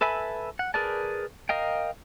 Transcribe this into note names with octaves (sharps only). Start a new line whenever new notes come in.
A4 B4 E5 G#5 B5
F#5
G#4 A#4 B4 D5 A5
A#4 D#5 F5 G5